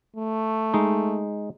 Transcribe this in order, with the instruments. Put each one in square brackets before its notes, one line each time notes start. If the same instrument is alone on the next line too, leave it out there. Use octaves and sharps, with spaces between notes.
[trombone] A3
[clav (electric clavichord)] G#3 D#4